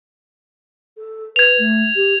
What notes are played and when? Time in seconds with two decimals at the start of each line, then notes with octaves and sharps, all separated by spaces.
0.97 A4
1.36 B4 G#6 F7
1.59 A3
1.96 G4